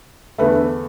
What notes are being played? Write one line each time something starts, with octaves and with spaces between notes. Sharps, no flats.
E2 D3 A3 B4 E5